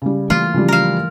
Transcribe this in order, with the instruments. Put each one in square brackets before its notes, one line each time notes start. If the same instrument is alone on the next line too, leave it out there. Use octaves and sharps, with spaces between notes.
[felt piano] C#3 G3
[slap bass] E3 A3 A#3 [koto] F4
[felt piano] C#3 F3 G3
[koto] A#4 F5